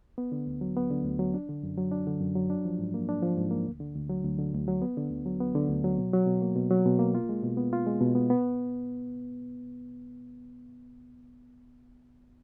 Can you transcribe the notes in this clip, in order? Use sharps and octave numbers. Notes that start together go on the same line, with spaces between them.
B3
D3
D2
F#3
B3
D3
D2
F#3
D4
D3
F#2
F#3
D4
D3
F#2
F#3
D4
F3
G#2
A#3
D4
F3
G#2
A#3
D2
D3
D2
F#3
D2
D3
D2
F#3
B3
D3
D2
F#3
B3
D3
D2
F#3
B2
F#3
B2
A#3
B2
F#3
B2
A#3
F4
G#3
B2
B3
F4
G#3
B2
B3
B3